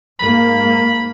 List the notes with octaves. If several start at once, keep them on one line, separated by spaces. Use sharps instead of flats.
G#2 A#3 B5